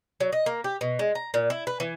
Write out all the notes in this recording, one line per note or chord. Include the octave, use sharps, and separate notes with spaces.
F#3
D#5
A#3
G4
B2
G#3
A#5
A#2
E4
B4
E3